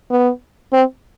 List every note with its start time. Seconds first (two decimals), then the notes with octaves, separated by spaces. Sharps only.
0.11 B3
0.73 C4